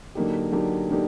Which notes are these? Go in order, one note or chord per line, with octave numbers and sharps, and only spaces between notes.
D3 F#3 A#3 D#4 G4
D3 F#3 A#3 D#4 G4
D3 F#3 A#3 D#4 G4